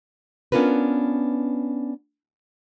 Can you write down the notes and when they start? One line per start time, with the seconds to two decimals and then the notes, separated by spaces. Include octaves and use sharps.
0.52 B3 C#4 D4 F4 A#4 B4